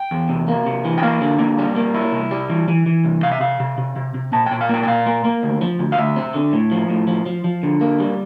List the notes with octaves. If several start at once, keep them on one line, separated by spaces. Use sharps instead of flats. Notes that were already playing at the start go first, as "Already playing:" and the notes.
Already playing: G5
E2
C3
A#3
C3
E3
G5
A#3 F5
D3
A#3
G3
A#3
E4
C2
G3
E3
E3
E3
C2
C3 F5
E5
C3 F5
C3
C3
C3
C3
A#2 A5
G5
A#2
F5
A#3 G5
G5
A#2 F5
A#3
A#3
D2
F3
D2
F5
D2 E5
C4
D3
A2
F3
A2
F3
F3
F3
D3
A#3
G3